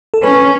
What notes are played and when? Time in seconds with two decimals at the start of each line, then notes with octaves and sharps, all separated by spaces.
0.14 A4
0.23 C#4 B4